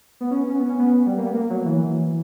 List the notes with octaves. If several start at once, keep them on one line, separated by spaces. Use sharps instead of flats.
B3
C#4
B3
C#4
B3
C#4
B3
G3
A#3
B3
A#3
F#3
E3